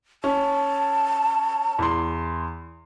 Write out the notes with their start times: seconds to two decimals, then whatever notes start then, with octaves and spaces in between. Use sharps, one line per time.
0.24 C#4 A5
1.79 E2 C6